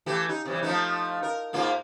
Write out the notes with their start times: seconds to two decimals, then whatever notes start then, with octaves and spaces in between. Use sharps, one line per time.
0.06 E3 A3 G4
0.29 D#4
0.45 C3 E3 G3
0.63 F3 A3 D#4
1.23 A#4
1.53 G#2 A#3 F4